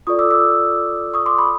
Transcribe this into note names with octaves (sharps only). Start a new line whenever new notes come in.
F4 A4 D5 C#6 D#6
D6 E6
D6 E6
C#6 D#6
C6 D6
B5 C#6